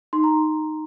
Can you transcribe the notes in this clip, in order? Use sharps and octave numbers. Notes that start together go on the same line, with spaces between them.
D#4 C6
A#5